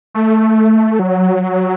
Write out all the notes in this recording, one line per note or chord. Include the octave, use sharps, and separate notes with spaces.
A3
F#3